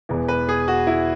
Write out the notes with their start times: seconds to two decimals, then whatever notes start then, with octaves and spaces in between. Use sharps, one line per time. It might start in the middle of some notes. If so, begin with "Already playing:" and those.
0.09 E1 E2 E3
0.28 B4
0.49 G#4
0.68 F#4
0.87 E4